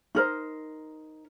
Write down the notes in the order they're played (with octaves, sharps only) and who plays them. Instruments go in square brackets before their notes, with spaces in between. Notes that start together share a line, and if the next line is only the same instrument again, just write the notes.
[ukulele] D#4 A#4 C5